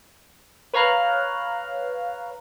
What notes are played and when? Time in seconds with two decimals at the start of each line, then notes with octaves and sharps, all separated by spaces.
0.73 B4 C#5 F5 A#5 F6 F#6